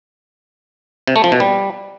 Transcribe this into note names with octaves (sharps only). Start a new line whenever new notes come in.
C3
A3
F3
B2
G3